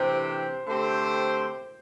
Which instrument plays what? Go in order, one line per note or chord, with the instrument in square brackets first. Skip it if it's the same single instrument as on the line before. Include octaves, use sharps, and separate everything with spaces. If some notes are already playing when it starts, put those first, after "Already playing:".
Already playing: [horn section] C3 E3 A3 D4 G4 [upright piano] C5
[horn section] D3 A3 C4 G4 C5